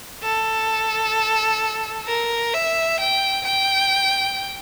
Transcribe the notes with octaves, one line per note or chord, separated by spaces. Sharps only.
A4
A#4
E5
G5
G5